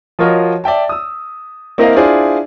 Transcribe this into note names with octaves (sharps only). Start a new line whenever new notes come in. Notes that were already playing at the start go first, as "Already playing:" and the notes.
F3 F4 F#4 A#4 C#5 D#5
D5 E5 G5 A5
D#6 E6
A#3 C4 E4 A#4 D#5 F5
D4 E4 F4 G#4 C5 D5